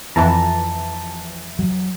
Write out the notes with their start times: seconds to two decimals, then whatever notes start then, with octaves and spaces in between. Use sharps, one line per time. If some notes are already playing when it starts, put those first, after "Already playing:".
0.16 F2 E3 A5 A#5
1.59 F#3